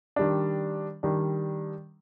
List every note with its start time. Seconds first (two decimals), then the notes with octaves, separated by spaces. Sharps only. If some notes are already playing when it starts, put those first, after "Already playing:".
0.16 D#3 G3 D4
1.03 D#3 G3 D4